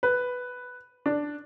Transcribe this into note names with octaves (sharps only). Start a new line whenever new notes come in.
B4
D4